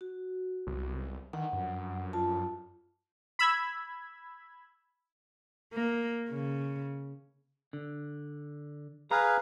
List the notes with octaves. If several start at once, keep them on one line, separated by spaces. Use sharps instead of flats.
F#4
C2
D#3 F#5
F#2
F4 A5
B5 E6 G#6
A#3
C#3
D3
G#4 B4 F5 A#5